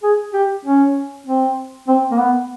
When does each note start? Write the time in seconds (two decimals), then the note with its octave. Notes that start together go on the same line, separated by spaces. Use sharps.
0.03 G#4
0.34 G4
0.65 C#4
1.27 C4
1.88 C4
2.11 A#3
2.19 B3